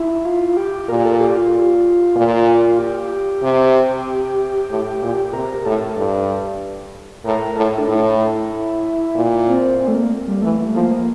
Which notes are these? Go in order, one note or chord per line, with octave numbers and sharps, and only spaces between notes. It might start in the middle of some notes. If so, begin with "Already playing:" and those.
Already playing: E4
F4
F4
G4
A#2 A#4
A4
G4
F4
A#2
G4
C3
A2
A#2
C3 A#4
A2 A4
G2
A2 A#4
A2 A4
D4
A2 E4
A#2
C4
C4
A3
A#3
G3
E3 A3
F3 A#3